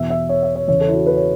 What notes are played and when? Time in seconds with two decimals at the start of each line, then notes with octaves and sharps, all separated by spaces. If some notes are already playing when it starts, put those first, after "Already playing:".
Already playing: E2 B2 B3 E5
0.10 E5
0.29 C#5
0.43 E5
0.55 C#5
0.68 E2 C#3 E3 C#5
0.81 A4
0.88 E4
0.94 F#4
1.06 B4
1.17 C#5